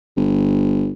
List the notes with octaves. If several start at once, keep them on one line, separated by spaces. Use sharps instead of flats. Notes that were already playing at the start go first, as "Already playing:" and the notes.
G1